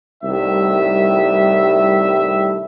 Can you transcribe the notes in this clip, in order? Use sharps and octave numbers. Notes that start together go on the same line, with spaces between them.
C2 A2 D#3 G3 E5